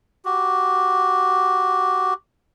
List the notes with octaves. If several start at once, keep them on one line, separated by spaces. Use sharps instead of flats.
F#4 G4